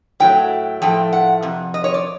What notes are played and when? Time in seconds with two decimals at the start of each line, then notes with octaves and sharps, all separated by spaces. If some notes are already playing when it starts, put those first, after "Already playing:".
0.20 A2 F#3 A3 G5
0.82 A2 F3 A3 G5
1.13 F#5
1.42 F2 C3
1.74 D#5
1.84 C#5
1.94 D5